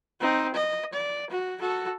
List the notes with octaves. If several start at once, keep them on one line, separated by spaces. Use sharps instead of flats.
C4 D#4
D#5
D5
F#4
F#4 A4